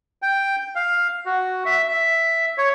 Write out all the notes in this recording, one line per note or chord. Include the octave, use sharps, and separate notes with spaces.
G5
F5
F#4
E5
E5
C#5